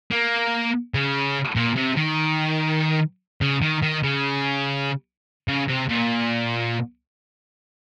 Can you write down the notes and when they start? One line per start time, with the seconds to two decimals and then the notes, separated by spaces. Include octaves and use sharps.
0.11 A#3
0.94 C#3
1.56 A#2
1.77 C3
1.97 D#3
3.41 C#3
3.62 D#3
3.82 D#3
4.04 C#3
5.48 C#3
5.68 C3
5.89 A#2